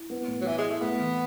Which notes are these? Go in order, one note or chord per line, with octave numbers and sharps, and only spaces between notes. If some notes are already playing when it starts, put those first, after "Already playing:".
Already playing: E4
B3
A2
F#3
E3 E4
G#3
E4
A3
A3 B3
E3